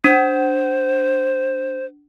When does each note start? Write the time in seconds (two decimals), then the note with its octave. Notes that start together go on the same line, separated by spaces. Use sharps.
0.04 D4 C5